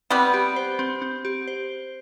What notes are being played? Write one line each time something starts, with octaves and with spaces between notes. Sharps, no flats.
G3 B3 C4
G4
C5
C4
C4
G4
C5